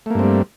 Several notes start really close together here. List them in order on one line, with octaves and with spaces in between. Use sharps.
A3 A#3 G2 C4 G3